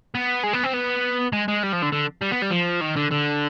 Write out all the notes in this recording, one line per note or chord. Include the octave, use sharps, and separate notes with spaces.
B3
G#3
B3
C4
B3
G#3
G#3
G3
F3
D3
D3
G3
B3
G3
F3
D#3
D3
D3